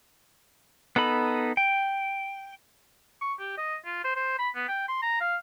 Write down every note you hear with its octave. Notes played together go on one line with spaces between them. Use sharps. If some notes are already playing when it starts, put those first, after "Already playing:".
B3 D#4 A4 B5
G5
C#6
G4
D#5
F4
C5
C5
B5
B3
G5
C6
A#5
F5